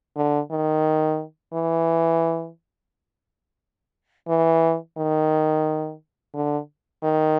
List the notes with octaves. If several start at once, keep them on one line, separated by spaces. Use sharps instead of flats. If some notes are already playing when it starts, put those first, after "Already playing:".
D3
D#3
E3
E3
D#3
D3
D#3